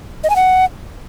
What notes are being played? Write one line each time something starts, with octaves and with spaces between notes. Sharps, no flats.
D#5
G#5
F#5